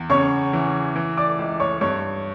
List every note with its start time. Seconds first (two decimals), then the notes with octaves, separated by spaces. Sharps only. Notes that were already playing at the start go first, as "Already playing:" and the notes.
Already playing: E2
0.10 C#3 C#5 C#6
0.53 E3
0.96 E3
1.17 D5 D6
1.39 C#2
1.60 C#5 C#6
1.81 G2 C#5 C#6